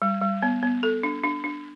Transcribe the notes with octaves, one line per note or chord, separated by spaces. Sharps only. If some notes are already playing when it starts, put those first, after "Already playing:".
G3
G3
B3
B3
A4
D4
D4
D4